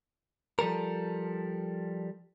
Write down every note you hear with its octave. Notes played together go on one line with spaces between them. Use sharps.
F3 G3 A4 A#4